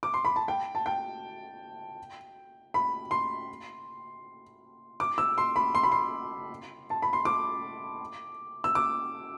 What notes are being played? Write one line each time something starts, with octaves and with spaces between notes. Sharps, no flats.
D6
C6
B5
A5
G5
A5
G5
B5
C6
D6
E6
C6
B5
C6
B5
C6
A5
B5
C6
D6
E6
D6